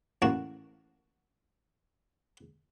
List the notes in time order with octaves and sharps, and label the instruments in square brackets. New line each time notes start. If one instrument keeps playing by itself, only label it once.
[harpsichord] A1 A#3 F#4 A5